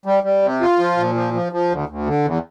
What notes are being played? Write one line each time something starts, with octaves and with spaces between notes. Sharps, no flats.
G3
G3
C3
F4
F3
A#2
F3
F3
F3
D2
D2
D3
E2